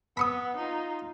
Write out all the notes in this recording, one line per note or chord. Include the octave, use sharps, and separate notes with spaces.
B3 B5 C#6 D#6
D#4 F4